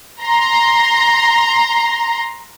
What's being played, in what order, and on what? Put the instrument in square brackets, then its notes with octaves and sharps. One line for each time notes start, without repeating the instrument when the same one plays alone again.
[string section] A#5 C6